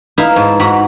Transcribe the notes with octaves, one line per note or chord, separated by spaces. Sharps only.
D#4 E4 B4 E5 F5
G#2 A5
G#2 F#4 A#5 B5